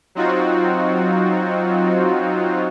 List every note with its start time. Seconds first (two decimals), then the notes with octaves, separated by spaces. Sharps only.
0.15 F#3 C4 D#4 F4 F#4